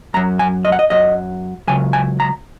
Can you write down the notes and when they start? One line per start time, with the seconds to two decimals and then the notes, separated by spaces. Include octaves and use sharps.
0.14 F#2 F#3 A#5
0.39 G#5
0.65 D#5
0.72 F#5
0.79 D#5
0.90 F#2 F#3 D#5
1.67 C#2 C#3 F#3 G#5
1.93 G#5
2.20 A#5